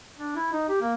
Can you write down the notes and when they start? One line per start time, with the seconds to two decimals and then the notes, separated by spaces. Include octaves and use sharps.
0.17 D4
0.36 E4
0.52 D#4
0.69 G4
0.81 A#3